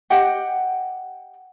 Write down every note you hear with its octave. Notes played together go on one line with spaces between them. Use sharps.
G4 D#5 F#5 G5